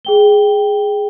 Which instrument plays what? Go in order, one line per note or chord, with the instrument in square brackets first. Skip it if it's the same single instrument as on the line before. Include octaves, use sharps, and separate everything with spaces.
[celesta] G#4 G5 G7